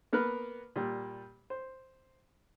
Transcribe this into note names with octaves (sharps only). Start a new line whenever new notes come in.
A#3 B3 A#4 B4
A#2 G3
C5